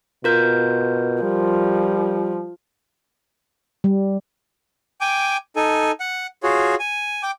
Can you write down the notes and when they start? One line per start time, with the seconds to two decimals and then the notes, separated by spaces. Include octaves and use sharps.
0.24 B2 F4 A#4 G6
1.23 F3 G3
3.84 G3
5.01 G5 G#5 D6
5.56 D#4 A4 G#5
6.00 F#5
6.43 F4 F#4 G#4 C#5
6.80 G#5
7.23 G5 D6